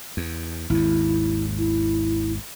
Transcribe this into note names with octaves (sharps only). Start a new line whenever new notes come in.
E2
G#1 D#2 E4
E4